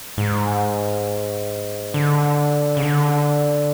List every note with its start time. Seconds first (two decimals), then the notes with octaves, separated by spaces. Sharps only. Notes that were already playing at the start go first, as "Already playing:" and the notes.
0.18 G#2
1.94 D3
2.77 C#3
2.83 D3